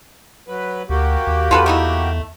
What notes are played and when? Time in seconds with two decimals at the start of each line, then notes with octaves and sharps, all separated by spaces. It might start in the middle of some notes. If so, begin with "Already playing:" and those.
0.48 F#3 B4
0.89 D2 A#3 F#4 G4
1.27 D#2
1.51 E2 F4 A4 B4
1.66 A3 D#4 E4